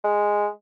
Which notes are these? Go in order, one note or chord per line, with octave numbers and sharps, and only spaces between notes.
G#3